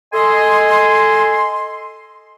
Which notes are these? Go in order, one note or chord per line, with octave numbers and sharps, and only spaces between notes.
A4 D#5 G#5 C6